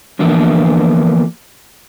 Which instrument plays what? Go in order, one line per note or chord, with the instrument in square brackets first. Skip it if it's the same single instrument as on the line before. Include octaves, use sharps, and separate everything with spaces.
[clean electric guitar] D3 E3 F3 A#3 B3 D4